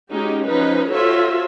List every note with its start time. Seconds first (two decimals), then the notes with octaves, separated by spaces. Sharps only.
0.11 G#3 C#4 D#4 F#4 G4
0.46 F3 C#4 D#4 B4
0.91 F4 F#4 A4 C5 C#5 E5